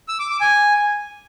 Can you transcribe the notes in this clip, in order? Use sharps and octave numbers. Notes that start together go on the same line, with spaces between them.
E6
D6
D6
G#5